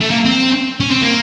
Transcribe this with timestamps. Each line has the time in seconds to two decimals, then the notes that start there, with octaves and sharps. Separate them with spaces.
0.01 A3
0.10 A#3
0.25 C4
0.80 C#4
0.91 C4
1.02 A#3